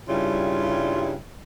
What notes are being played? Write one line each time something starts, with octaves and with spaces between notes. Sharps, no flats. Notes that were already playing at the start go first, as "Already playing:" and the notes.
G2 C#3 G3 E4 F4